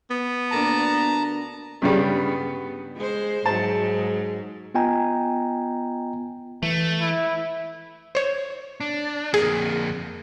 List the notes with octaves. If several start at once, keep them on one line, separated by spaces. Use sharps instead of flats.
B3
D2 A#3 D4 A5 A#5
G2 C#3 G3 B3
G#3 C5
G#2 F#3 A5
B3 F4 D#5 G5 G#5 A#5
E3 A3
E4
C5 C#5
D4
F2 A#3 G#4